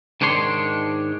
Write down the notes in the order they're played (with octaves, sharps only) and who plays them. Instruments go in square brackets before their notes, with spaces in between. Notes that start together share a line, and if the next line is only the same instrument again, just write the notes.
[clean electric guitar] G#2 D#3 D4 C#5 C6